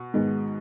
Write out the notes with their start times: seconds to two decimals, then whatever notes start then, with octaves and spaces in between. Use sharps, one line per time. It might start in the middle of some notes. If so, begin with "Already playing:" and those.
Already playing: B2
0.14 G#2 D#3 G#3 B3